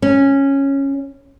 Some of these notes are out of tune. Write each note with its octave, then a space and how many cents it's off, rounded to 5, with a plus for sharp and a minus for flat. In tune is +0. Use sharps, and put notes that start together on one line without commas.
C#4 -10